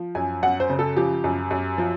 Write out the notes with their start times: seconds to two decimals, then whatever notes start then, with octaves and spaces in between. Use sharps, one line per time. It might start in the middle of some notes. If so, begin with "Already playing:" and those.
Already playing: F3
0.15 F#2 G#5
0.43 F#2 F#5
0.60 C5
0.70 C#3
0.79 A4
0.96 F3 G4
1.24 F#2
1.51 F#2
1.78 F3